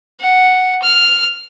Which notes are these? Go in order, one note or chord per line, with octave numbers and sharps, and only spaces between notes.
F#5
F6